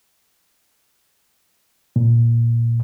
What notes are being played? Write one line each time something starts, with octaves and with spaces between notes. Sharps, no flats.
A#2